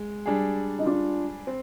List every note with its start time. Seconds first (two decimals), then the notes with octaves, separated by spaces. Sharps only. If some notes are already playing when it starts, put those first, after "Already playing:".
Already playing: G#3
0.25 G3 D4 G#4
0.79 D#4
0.86 D4 F4
1.47 C4